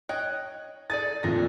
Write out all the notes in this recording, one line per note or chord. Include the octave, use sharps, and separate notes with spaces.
C#5 D#5 G5 F#6
G#4 A4 D5 A6 D#7
F2 A#2 G#3 A3 D4 A#6